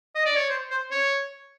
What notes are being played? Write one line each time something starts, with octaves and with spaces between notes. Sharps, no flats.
D#5
D5
C#5
C5
C5
C#5